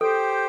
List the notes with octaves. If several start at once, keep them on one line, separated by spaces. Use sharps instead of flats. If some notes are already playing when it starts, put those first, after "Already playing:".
G4 A4 C5 G5